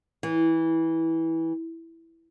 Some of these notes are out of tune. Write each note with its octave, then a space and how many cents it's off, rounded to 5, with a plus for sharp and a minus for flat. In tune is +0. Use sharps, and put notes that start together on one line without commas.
E3 -15